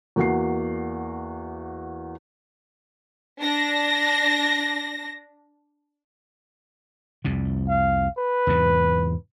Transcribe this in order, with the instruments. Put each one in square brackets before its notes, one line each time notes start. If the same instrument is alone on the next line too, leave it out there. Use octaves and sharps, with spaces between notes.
[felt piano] E2 A#3 F#4 F#5 C7
[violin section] D4 A#6
[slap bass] C2 F2 C3
[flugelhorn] F5
B4
[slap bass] E2 G#2 C3